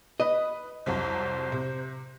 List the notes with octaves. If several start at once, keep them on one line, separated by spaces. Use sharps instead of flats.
B4 D#5 D#6
C2 F2 F#3 C5
C3